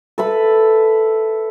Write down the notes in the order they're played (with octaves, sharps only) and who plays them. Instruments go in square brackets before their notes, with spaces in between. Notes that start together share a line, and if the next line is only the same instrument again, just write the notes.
[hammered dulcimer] A4 B4 E5 B5